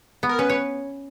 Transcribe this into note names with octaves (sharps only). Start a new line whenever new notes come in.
B3
A#4
C#4 B4
C#5